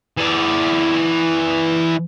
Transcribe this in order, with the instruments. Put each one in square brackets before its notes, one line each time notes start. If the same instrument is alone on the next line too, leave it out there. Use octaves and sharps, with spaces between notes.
[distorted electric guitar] E3 D5